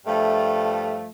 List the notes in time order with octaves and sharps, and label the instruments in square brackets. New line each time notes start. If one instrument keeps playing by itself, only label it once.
[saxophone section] G2 F3 A3